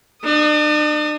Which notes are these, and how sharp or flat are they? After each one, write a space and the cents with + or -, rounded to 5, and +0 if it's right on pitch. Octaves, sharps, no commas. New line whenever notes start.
D4 +40 D#6 -5